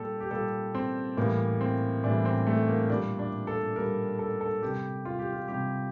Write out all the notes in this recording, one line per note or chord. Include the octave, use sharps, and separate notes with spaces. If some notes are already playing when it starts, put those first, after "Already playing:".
Already playing: A#2 G3 G4 A4
G4
A#2 G3 A4
C4
A2 E3 G3 A#3
C4
A2 E3 G3 D4
C4
A3
A#3
A#2 G3 D4
D4
A4
A#2 G3 A#4
A4
A4
C3 G3 G4
F4
G4
F4
C3 G3 G4